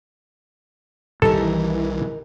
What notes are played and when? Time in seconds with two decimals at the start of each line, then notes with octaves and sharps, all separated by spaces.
1.22 B1 D#3 E3 G3 G4 A4 A#4 D#5